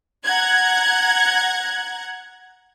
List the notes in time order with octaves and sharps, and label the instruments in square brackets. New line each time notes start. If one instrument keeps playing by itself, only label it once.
[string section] F#5 A#5 F#6 G#6